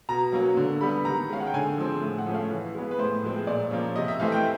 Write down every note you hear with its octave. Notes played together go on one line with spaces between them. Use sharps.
B2 A#5
F#3 A#3 C#4
D3
G3 B3 B5
D#3 A#5
G#3 C#4 F5
F#5
G5
D3 G#5
F3 G#3 C4
A2
F#5
F3 A3 C#4
F5
E3
G#3 B3
B4
A2 C5
F3 G#3 C4
A#2 D5
F3 A#3 C#4
C3 D#5
E5
E3 A3 C4 F5
G5